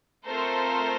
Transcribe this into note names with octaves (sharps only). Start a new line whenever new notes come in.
A3 C4 F4 A4 A#4 C5